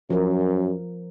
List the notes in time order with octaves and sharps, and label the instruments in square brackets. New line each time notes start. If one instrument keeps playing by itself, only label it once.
[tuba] F#2 [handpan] F3 A#4